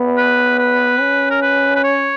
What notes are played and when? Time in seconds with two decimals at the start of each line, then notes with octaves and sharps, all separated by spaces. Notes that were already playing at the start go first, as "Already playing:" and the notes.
Already playing: B3
0.17 B4
0.59 B4
1.01 C#4
1.31 A#4
1.42 B4
1.76 B4
1.84 C#5